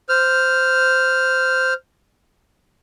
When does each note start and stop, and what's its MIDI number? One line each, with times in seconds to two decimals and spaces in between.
0.09 1.74 72
0.09 1.74 89